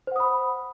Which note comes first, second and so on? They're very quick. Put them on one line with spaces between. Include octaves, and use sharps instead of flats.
C5 F#5 D#6 B5